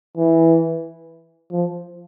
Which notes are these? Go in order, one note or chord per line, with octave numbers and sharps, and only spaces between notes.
E3
F3